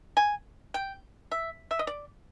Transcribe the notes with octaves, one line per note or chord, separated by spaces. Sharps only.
G#5
G5
E5
E5
D#5
D5